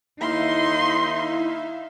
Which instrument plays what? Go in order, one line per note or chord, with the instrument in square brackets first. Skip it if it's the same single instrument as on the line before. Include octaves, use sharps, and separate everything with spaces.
[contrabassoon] D#2 [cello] D#4 [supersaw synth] E4 E5 F5 [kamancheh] C6